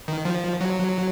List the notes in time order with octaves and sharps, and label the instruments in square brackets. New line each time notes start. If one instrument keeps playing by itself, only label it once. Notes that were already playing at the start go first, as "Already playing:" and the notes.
[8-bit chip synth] D#3
F3
F#3